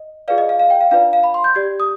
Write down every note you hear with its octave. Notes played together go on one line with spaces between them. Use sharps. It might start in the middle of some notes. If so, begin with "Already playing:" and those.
Already playing: D#5
F4 G#4 B4 D5 F5
D#5
F5
F5
G5
F5
D4 F4 B4 D5 F5
F5
B5
C6
G6
G4 D5 G#6
D#6